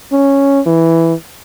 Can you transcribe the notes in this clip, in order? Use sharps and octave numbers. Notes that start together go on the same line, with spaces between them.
C#4
E3